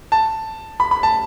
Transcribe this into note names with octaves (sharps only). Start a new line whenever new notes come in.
A5
B5
B5
A5